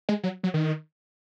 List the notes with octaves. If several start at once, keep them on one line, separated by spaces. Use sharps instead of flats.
G#3
F#3
F#3
D#3